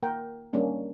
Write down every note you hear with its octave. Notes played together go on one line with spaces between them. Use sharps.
A#3 A#4 F#5 G5
G3 A#3 C#4 D4 G#4